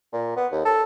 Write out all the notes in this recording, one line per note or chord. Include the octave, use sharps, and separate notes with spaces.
A#2
B3
D#2
A4